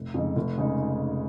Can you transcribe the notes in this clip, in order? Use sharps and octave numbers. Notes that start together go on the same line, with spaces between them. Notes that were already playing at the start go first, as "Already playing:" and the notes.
Already playing: F1
F2 C#3 G#3 D#4
F1
C#3 G#3 D#4